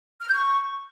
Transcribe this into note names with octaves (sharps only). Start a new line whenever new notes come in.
F6
G6
C#6